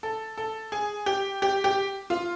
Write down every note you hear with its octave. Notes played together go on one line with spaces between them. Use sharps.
A4
A4
G#4
G4
G4
G4
F4